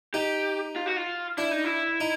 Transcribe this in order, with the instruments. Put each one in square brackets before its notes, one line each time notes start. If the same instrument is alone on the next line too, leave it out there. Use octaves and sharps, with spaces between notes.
[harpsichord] D#4 [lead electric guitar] G4
[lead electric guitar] F4
F#4
F4
[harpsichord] D4 [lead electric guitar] E4
[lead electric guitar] D#4
E4
[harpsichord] D#4